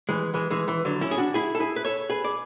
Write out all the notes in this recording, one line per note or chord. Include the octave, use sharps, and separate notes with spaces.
E3 G#3
E3 G#3
E3 G#3
E3
D3 F#3
C#4 E4
G#4
D4 F#4
E4 G#4
A4
E4 G#4
B4
A4 C#5
G#4 B4
D5